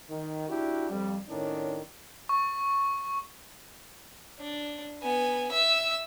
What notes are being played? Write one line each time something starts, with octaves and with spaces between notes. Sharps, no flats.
D#3
D4 E4 F#4 G4
F2 G3
A2 D#3 C#4 D4
C#6
D4
B3 G#5
E5 E6